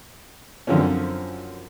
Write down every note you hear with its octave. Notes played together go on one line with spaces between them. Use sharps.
F#2 D3 F3 C4 C#4